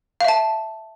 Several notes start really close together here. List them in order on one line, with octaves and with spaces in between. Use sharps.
F5 E5 A5